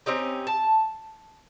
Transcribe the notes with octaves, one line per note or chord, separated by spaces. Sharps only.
C4 C#4 D#4 G4
A5